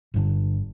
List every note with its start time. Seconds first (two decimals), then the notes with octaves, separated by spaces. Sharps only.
0.14 G1 G2 D3